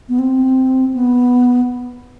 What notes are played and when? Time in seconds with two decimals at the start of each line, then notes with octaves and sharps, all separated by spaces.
0.09 B3
0.19 C4
0.94 B3